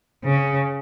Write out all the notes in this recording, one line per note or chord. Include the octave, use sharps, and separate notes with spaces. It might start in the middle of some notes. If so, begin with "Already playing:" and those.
C#3